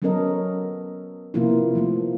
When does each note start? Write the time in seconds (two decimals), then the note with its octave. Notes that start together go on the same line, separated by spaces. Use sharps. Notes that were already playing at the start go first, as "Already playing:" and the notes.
0.02 F#3 B3 C#4 A4 A#4 D#5
1.34 C3 F3 A#3 B3 E4 F4
1.75 F3 A3